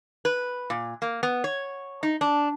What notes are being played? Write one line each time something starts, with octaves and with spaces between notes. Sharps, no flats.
B4
A#2
A#3
B3
C#5
D#4
D4